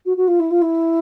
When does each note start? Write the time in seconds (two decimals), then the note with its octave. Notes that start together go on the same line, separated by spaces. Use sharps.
0.05 F#4
0.16 F#4
0.27 F4
0.39 E4
0.50 F4
0.61 E4